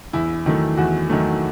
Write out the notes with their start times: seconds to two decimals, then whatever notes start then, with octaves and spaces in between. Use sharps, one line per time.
0.13 E2 E4
0.45 D#3 F#3 A3 E4
0.77 E2 F#4
1.10 D#3 F#3 A3